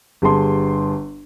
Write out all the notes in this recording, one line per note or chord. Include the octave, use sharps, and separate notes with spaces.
G1 G4 G#4 A5 C6